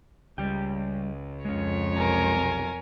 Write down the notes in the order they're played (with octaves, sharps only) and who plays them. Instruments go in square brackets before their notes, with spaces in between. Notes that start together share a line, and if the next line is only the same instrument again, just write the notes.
[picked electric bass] C#2 [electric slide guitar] G3 G4 G5
[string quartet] F2 C#5 [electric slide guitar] G#3 C#4
[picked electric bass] B1 C3 [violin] A#4 G#5